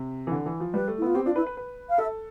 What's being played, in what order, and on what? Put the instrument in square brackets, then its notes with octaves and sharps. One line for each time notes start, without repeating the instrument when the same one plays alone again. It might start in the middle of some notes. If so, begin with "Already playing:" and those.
Already playing: [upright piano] C3
E3
D3
E3
F3
[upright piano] G3 [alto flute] B4
[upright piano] A3
[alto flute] E4
[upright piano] B3 [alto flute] F4
[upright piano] C4 [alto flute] G4
[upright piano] D4 [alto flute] F4
[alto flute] E4 [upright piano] B4
[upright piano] B4
B4
[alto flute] F5
[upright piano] A4 [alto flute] E5